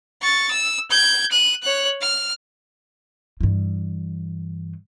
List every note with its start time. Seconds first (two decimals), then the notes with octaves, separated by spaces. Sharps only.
0.22 C#6 A6
0.51 E6
0.91 G6 G#6
1.31 F#6 D#7
1.63 C#5 F#6
2.02 F6
3.41 G2 E3